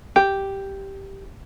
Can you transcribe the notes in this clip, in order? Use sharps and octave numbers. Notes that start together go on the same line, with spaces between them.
G4